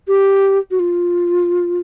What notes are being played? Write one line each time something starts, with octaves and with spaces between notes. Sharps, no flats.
G4
F#4
F4